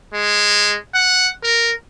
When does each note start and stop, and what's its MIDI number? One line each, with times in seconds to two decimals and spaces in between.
0.14 0.77 56
0.95 1.30 78
1.44 1.71 70